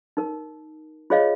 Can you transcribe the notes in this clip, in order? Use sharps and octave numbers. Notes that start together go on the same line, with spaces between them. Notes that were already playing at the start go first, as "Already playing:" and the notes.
D#4 A#4
F4 G#4 C5 C#5 D#5 F5